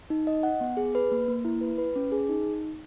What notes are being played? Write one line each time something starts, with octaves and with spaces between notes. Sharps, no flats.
D#4
D#5
F#5
B3
G#4
B4
A#3
A#3
E4
B4
B4
C#4
G#4
D#4